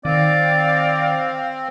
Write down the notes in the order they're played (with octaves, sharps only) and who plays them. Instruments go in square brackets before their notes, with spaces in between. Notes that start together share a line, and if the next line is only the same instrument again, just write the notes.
[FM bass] D#3 [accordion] C4 [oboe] D5 [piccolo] F5